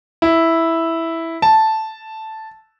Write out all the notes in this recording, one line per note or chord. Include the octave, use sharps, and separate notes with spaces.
E4
A5